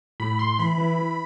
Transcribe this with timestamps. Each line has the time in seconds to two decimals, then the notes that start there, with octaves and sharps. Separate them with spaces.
0.20 A2 B5
0.39 A2 C6
0.59 E3 B5
0.78 E3
0.99 E3